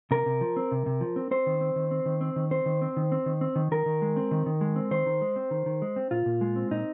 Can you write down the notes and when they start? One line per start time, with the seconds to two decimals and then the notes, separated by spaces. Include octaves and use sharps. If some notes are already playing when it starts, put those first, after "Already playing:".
0.11 C3 A#4
0.26 C3
0.41 F3
0.56 C4
0.72 C3
0.86 C3
1.01 F3
1.16 C4
1.31 C4 C5
1.46 D#3
1.61 C4
1.76 D#3
1.91 C4
2.06 D#3
2.21 C4
2.36 D#3
2.51 C4 C5
2.66 D#3
2.82 C4
2.97 D#3
3.12 C4
3.26 D#3
3.41 C4
3.56 D#3
3.71 D#3 A#4
3.86 D#3
4.02 G#3
4.16 C4
4.31 D#3
4.46 D#3
4.61 G#3
4.76 C4
4.91 D#3 C5
5.06 D#3
5.21 G#3
5.36 C4
5.51 D#3
5.66 D#3
5.82 G#3
5.96 C4
6.11 A#2 F4
6.26 A#2
6.41 G#3
6.56 C4
6.71 A#2 D#4